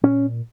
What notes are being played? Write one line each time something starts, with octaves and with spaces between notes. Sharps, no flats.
A#2 C#4